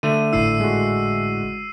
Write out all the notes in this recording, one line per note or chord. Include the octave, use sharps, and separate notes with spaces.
D3 A3 D#7
G#1 A2 E4 E6 C7 D#7
G#3 F#4